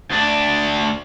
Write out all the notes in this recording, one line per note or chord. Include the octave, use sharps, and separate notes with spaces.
D2 D4